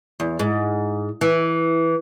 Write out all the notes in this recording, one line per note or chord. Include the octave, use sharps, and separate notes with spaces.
E2
G#2
E3